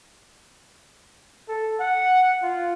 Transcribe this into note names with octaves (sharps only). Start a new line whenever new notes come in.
A4
F#5
F4